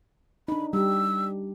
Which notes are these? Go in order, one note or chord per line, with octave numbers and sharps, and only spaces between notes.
D4 D#4 B5
G3 G4 E6